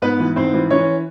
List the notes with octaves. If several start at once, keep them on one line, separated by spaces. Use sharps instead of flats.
G#2 B3 B4
E3
G#2 C4 C5
E3
E3 C#4 C#5